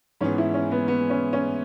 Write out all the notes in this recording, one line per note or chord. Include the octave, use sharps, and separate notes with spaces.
G#2 E3 B3 C#4 G#4
E4
C#4
B3
B3
C#4
C#4